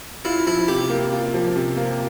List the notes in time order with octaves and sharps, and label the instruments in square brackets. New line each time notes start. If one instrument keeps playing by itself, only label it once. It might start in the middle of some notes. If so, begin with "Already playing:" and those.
[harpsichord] E4 [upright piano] F4
[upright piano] F3 [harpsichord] E4
[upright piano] C3 [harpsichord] G4
[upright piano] A#3
F4
F3
C3
A#3